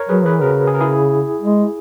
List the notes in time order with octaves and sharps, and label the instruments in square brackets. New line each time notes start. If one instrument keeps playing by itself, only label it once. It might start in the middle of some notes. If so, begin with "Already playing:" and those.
Already playing: [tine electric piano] A#4 C#5
[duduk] F#3 [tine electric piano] G#4 B4
[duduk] E3 [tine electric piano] G#4 B4
[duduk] C#3 [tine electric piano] F#4 A#4
[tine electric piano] G#4
A#4
E4 G#4
[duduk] G#3